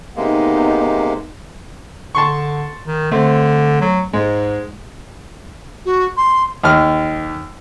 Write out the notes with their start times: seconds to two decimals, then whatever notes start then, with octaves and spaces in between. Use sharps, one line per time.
0.16 C3 G#3 A#3 B3 D#4
2.15 D3 A5 C6 C#6
2.87 D#3
3.11 D3 A3 C4
3.81 F#3
4.13 G#2 G#3
5.85 F#4
6.17 C6
6.64 D#2 F6